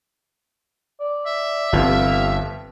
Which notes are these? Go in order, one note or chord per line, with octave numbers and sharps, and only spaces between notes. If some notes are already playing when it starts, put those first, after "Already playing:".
D5
E5
G1 G2 C3 F3 F5